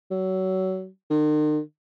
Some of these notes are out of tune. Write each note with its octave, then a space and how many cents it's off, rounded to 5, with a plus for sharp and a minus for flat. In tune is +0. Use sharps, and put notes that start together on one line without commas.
F#3 +25
D#3 -45